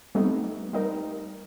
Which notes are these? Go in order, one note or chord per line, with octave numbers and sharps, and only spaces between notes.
G3 A3 B3 C4 D#4
G3 D#4 A#4